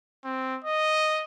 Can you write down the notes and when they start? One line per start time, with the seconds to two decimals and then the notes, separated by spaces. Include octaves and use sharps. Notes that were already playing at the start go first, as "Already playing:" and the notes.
0.24 C4
0.64 D#5